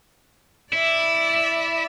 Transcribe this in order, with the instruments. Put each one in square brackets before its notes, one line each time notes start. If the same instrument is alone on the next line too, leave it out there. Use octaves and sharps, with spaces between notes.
[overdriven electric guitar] E4 [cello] D5 E5